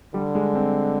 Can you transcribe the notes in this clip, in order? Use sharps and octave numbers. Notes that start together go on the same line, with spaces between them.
D3 G3
G#3
C4